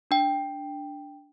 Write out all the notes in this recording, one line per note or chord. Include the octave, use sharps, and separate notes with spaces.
D4 G5